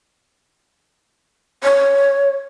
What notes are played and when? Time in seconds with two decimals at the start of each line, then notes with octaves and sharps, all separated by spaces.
1.63 C#5